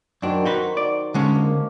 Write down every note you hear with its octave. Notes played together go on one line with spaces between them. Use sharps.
F#2 D#3 F#3 D4 C5
D#4 F#4 B4
D5
D3 G#3 C#4
A#3